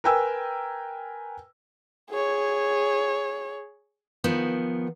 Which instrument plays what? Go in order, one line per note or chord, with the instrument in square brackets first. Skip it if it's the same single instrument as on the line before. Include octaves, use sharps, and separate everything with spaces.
[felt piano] A#4 B4 G5 G#5 E6
[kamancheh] G#4 C#5
[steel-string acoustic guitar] D#3 F3 B3